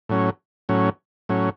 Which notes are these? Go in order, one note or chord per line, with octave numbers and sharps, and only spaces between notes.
A2 F#3 C#4
A2 F#3 C#4
A2 F#3 C#4